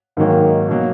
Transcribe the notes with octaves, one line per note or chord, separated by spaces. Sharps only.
G#2 D#3 F#3 A#3
B2 F#3 A#3